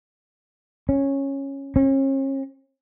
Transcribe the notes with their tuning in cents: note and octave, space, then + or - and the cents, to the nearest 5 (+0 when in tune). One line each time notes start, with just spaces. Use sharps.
C#4 -10
C#4 -40